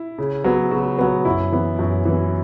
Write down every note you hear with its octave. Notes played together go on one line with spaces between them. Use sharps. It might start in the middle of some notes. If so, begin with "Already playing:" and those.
Already playing: E4
C#3
F#3 B3
C#3 F#4
F#3 B3
F#2 E4
E3 B3
F#2
E3 B3